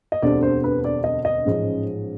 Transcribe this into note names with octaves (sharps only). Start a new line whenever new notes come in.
D#5
E1 D2 D3 G3 C4 D5
C5
B4
D5
D#5
D#5
A1 G#2 F3 G#3 C#4